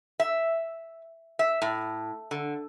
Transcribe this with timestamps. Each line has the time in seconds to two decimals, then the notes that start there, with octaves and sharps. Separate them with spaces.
0.20 E5
1.39 E5
1.62 A2
2.31 D3